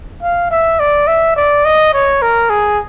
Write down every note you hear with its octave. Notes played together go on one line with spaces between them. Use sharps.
F5
E5
D5
E5
D5
D#5
C#5
A#4
G#4